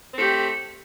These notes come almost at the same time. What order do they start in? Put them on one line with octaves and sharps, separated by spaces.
C4 A3 G4